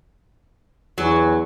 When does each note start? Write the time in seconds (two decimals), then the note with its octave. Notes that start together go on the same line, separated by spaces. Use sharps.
0.98 E2 F#3